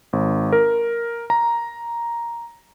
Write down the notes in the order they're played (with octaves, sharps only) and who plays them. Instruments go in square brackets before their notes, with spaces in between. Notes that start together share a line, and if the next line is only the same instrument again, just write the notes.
[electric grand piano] G#1
A#4
A#5